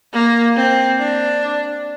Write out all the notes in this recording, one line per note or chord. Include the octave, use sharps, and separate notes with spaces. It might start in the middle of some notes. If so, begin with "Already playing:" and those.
A#3
C4
D4